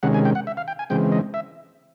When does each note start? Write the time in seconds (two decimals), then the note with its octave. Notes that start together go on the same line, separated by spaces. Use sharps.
0.03 C3 D#3 G#3 C#4 F#5
0.14 G#5
0.25 G5
0.35 F#5
0.47 E5
0.57 F5
0.68 G5
0.79 G#5
0.90 C#3 E3 G#3 C4 G5
1.12 D#5
1.34 E5